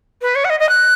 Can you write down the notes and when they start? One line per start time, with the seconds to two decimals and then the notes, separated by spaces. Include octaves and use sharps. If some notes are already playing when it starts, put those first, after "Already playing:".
0.22 B4
0.35 C#5
0.45 F#5
0.50 D#5
0.60 D#5
0.69 F#6